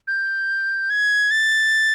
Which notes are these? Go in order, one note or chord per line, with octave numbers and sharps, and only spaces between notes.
G6
G#6
A6